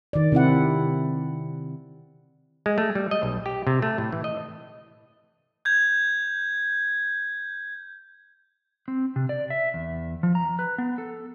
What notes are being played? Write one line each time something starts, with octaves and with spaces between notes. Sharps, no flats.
D#3 D5
C3 C4 E4 F#5
G#3
A3
G3
D#5
B1
G4
C3
A3
A2
E3
D#5
G6 G#6
C4
C3
D5
E5
E2
F3
A#5
B4
B3
A4